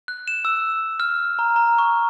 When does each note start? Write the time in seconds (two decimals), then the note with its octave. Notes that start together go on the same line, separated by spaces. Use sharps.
0.08 F#6
0.28 E7
0.45 E6
1.00 F6
1.39 A#5
1.56 A#5
1.78 C#6